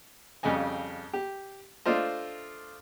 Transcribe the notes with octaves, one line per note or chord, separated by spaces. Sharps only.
F2 C#3 G3 D#5 G#5
G4
A3 D4 F4 C5 D#5